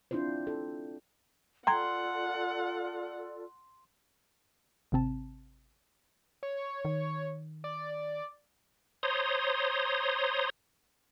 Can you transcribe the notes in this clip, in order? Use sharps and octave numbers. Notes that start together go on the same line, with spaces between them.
C4 D4 E4 F4 C5
A4
F4 A4 D5 F#5 G5 A#5 C6 G#6
G#1 C3 C4 A5
C#5
D#3
D5
C5 C#5 A#5 C6 D#6